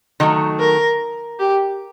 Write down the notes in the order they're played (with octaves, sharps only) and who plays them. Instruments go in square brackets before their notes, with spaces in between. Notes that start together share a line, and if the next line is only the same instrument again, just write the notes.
[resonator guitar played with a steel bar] D#3 F#3 A3
[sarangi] A#4
G4